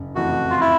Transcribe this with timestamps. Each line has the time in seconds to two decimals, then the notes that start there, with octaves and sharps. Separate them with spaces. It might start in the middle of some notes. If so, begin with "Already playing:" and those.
Already playing: F#1
0.15 F2 C3 E3 A3 F#4
0.50 F4
0.60 E4